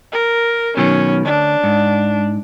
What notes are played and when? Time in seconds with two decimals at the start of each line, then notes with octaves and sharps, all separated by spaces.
0.12 A#4
0.77 B2 D#3 F#3 C#4
1.25 D2 D4
1.64 G#2